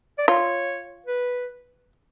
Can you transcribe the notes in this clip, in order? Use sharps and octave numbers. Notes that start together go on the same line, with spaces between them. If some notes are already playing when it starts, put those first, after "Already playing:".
D5
F4 C#5
B4